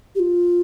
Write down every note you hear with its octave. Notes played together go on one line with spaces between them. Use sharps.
G4
F4